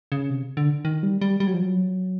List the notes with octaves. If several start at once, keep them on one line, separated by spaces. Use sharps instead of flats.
C#3
C3
D3
D#3
G3
G3
G3
F#3
F3
F#3